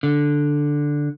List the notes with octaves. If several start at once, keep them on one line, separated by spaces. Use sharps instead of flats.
D3